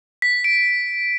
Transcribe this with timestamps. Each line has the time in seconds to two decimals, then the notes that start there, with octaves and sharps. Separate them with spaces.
0.22 B6
0.44 D7